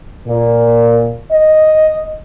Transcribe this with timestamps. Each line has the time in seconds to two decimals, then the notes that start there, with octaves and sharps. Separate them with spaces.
0.27 A#2
1.31 D#5